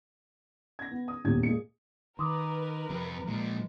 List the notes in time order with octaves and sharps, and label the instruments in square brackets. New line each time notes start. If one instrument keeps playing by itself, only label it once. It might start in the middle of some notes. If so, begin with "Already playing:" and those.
[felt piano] G#6 A#6
B3
D#6
D#1 E2 C#3 G4 G#6
A#2 G#3 C#7
[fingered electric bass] D#3 [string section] A#4 B4 [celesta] C6 D6 D#6
[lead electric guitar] F2 [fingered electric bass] C3
[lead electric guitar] A#2 F3 [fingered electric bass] G#3